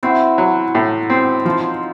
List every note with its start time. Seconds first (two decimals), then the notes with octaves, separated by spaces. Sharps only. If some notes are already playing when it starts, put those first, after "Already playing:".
0.03 C4 E4 F#4
0.38 F#3
0.75 A2
1.10 C4
1.45 F3 D#4 F4